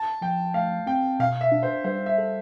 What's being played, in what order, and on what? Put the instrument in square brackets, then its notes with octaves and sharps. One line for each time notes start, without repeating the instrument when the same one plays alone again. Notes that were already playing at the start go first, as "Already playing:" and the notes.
Already playing: [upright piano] A5
[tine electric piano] F3 [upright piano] G5
[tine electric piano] A3 [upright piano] F5
[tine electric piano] C4 [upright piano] G5
[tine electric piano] B2 [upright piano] F5
[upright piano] E5
[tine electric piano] D4
[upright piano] C5
[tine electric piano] G3 [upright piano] C5
[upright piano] E5
[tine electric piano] A4